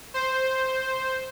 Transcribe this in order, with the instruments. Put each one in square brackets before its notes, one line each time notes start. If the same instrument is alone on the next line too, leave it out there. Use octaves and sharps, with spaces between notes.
[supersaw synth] C5